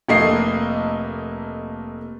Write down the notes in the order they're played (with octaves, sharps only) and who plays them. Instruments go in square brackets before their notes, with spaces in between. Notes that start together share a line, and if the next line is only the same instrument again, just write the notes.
[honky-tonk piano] F1 A3 A#3 D#5 C7